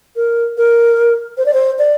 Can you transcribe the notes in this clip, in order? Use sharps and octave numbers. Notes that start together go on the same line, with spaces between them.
A#4
A#4
C5
D5
C5
D5